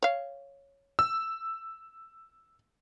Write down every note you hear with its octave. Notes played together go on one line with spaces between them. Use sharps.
C#5 F5
E6